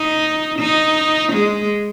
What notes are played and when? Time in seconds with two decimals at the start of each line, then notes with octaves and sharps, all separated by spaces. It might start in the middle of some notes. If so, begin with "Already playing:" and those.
Already playing: D#4
0.59 D#4
1.33 G#3